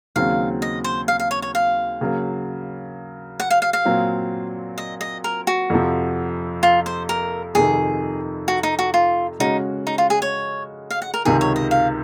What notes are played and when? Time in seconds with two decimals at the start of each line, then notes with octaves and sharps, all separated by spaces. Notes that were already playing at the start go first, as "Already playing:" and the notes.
0.16 D#2 C#3 F#3 C4 F5
0.62 D#5
0.84 C5
1.08 F5
1.20 F5
1.31 C#5
1.42 C#5
1.55 F5
2.01 C#3 F#3 A#3
3.40 F#5
3.50 F5
3.62 F5
3.73 F5
3.85 A#2 F#3 C4
4.78 D#5
5.01 D#5
5.24 A#4
5.47 F#4
5.70 F2 C3 F3
6.63 F4
6.86 C5
7.09 A#4
7.55 F2 C3 D#3 G#4
8.48 F#4
8.63 D#4
8.79 F#4
8.94 F4
9.40 C#3 G#3 C#4 D#4 F#4
9.87 D#4
9.98 F4
10.10 G#4
10.22 C#5
10.91 F5
11.02 F#5
11.14 A#4
11.25 C#2 C3 D#3 G#4
11.41 C#5
11.56 D#5
11.71 F5